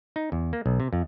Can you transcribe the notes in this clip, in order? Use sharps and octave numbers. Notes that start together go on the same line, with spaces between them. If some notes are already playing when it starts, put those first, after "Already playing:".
D#4
E2
A#3
B1
C3
F2